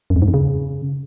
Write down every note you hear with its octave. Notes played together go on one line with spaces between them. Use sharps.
F#2
F2
G#2
F2
C#3